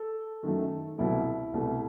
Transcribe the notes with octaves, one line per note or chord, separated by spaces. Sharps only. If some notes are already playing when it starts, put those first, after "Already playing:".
Already playing: A4
F#2 D#3 F#3 A3
C2 B2 F#3 A3 E4
C2 B2 A3